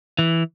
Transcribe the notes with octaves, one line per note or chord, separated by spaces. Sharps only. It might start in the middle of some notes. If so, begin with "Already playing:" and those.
E3